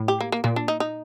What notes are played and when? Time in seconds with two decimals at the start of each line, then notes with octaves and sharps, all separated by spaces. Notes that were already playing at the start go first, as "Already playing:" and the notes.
Already playing: A2
0.08 G4
0.20 A#3
0.32 A#3
0.44 A#2 A#3
0.56 D4
0.68 D#4
0.80 D#4